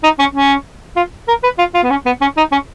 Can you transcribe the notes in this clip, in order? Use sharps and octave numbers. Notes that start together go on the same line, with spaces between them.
D#4
C#4
C#4
F4
A#4
B4
F4
F4
B3
C#4
B3
C#4
D#4
C#4